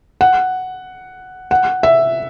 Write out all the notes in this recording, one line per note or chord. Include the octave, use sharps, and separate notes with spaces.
F#5
F#5
E5